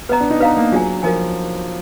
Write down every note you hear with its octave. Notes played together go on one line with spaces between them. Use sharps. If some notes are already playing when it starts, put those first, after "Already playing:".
B3 B4 D#5 A#5
D4
D#4
B3 B4 F5 A#5
A#3
F#3 D4 F4 G#4 D5 G#5
F3 F4 A#4 D#5 G#5